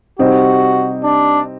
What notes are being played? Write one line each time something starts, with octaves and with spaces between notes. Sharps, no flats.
C3 G3 C4 D#4 F#4
D4